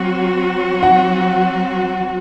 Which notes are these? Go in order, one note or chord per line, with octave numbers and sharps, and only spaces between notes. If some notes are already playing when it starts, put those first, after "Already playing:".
Already playing: F#3 C4 F#4
F#5